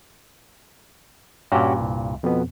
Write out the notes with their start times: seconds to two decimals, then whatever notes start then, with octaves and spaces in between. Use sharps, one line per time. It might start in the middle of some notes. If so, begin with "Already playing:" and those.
1.52 G2 A#2 C#4 F#4 G4
1.80 C2
2.23 F2 B2 B3